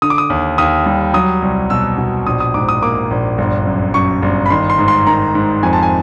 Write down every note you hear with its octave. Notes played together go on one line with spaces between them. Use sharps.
D3 D#6
D6
D#6
D#2
D#2 D#6
G3
F#3 D#6
C2
B2 E6
B2
A#1 D#6
D#6
G#2 D6
D#6
A#3 D6
A#1
G1
F#2
F#2 C#6
G1
B5
D#3 C6
C6
G#2
C6
D#3 A#5
G#2
F2 G#5
A5
G#5